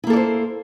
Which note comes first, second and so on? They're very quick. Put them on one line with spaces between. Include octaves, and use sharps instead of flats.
E4 A#3 A4 D5 C5